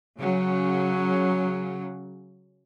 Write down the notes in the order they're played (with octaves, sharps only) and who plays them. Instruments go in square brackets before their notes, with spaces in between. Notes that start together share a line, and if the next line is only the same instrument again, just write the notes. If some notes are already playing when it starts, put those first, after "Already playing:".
[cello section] C#3 F#3